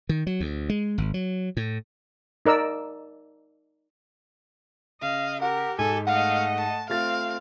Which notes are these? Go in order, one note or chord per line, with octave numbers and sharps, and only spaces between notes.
D#3
F#3
D2
G#3
G#1
F#3
A2
D#4 A#4 D5 E6
C#3 D#5 F5
G4 A#4 F#5
G#2 A4 G#5
A3 D#5 F5 F#5
A5
A3 C4 F4 F5 A6